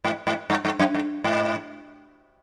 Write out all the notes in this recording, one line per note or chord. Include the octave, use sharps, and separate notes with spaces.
G#2
G#2
G2
G2
F#2
G2
G#2